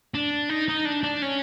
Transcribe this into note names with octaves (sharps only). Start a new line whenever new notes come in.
D4
D#4
D#4
D4
D4
C#4